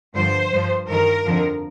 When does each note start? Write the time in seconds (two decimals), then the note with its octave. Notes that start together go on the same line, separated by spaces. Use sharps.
0.14 G2 D3 F3 C5
0.51 G2 F3
0.88 G2 D#3 A#4
1.25 F2 D3 F3